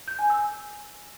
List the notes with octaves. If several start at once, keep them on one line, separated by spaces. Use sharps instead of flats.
G6
G#5
E6